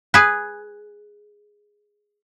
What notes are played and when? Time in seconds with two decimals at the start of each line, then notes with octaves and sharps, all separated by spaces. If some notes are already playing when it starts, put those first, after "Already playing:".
0.14 G#4 B4